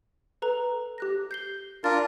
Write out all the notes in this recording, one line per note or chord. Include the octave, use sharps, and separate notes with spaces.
A4 B4 A#5
G4 F#6 A#6
G6 C7 G7
D4 F4 A#4 A6